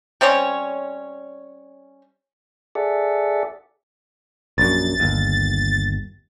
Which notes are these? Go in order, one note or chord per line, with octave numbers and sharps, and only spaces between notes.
G3 C4 C#4 C#5
G#4 A4 D5 E5 F#5
A#1 F#2 A6
G1 D#2